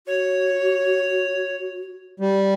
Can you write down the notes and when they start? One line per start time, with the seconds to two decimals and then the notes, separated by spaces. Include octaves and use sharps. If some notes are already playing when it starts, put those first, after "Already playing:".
0.07 F#4 C#5
2.20 G3